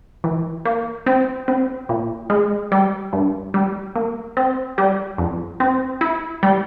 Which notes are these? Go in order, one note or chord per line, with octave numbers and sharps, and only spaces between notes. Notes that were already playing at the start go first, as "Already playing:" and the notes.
E3
A#3
C4
C4
A#2
G#3
G3
G2
G3
A#3
C4
G3
F2
C4
E4
G3